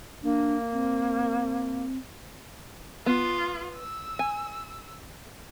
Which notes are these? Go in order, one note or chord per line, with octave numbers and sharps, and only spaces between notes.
A#3 D4
C4
B3 F4
E6
G#5